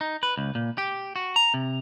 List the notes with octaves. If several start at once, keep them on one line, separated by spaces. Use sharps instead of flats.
D#4
B4
C#2
A#2
G4
F#4
A#5
C3